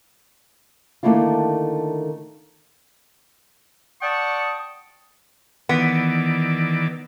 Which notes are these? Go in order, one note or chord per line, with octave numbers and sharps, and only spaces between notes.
D3 D#3 A3 A#3 E4 F4
D5 F#5 G5 A5 C#6 D#6
D#3 E3 B3 D5